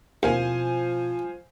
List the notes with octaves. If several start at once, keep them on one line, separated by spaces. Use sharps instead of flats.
D#2 B2 F3 C4 E4 C5 F5 G#5